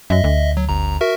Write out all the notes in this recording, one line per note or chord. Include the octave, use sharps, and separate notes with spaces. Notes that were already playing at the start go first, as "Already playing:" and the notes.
F#2 D#5 E5
D2
F#3
G1 A#5
F#4 A#4 E5